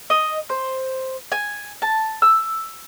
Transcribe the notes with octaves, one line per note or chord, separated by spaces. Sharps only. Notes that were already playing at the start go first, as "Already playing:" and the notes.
D#5
C5
G#5
A5
E6